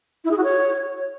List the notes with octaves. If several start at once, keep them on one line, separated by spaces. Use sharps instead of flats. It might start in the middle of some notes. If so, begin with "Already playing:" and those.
E4
G#4
F#4
C#5